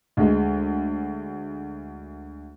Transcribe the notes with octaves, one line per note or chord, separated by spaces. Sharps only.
D2 G#3